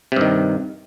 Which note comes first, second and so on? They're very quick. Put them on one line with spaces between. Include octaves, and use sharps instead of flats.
C3 G2 D#3